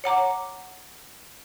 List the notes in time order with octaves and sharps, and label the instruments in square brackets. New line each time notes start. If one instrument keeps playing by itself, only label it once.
[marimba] C#5 F#5 A#5 D6